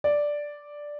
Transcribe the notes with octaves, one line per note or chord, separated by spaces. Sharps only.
D5